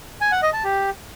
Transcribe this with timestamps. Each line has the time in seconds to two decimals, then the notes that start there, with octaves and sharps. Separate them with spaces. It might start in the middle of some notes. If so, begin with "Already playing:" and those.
0.21 G#5
0.32 F#5
0.42 D#5
0.53 A5
0.64 G4